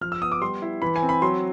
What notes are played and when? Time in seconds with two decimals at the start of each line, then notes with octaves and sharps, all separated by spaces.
0.01 F3 F6
0.12 E6
0.22 B3 D#6
0.32 D6
0.41 G3 C6
0.62 E4
0.82 E3 B5
0.96 G#5
1.02 C4
1.09 B5
1.22 F#3 C6